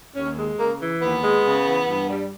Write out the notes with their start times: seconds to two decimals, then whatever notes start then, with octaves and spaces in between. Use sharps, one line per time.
0.16 D#2 C#4
0.38 G#3
0.59 C#3 A#3
0.81 E3
1.03 D#2 B3
1.24 G#3
1.46 C#3
1.66 E3
1.88 G2
2.10 G3